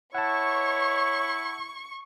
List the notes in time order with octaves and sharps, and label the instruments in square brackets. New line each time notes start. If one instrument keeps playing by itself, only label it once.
[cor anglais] E4 [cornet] C#5 [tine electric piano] F#5 A5 [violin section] C#6